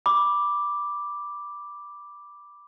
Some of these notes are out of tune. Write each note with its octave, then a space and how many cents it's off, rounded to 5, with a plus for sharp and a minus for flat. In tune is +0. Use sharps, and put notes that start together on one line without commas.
B5 -10 D6 +0